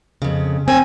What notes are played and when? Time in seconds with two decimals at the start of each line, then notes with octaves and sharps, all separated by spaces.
0.22 F2 C#3
0.68 C4 G#5